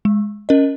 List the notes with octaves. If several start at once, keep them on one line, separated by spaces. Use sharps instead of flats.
G#3
C#4 A#4 D#5